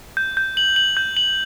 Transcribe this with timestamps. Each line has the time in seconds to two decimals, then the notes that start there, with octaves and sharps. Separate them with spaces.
0.17 G6
0.37 G6
0.57 F#7
0.76 F#7
0.97 G6
1.17 F#7